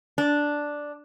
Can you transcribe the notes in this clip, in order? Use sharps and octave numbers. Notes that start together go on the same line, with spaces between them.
D4